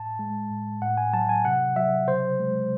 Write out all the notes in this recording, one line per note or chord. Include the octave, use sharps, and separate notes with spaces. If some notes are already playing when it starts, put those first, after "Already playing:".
Already playing: A2 A5
G#3
A2
A2 F#5
G#5
F#3 A5
G#5
C3 F#5
F#3 E5
C#3 C5
G#3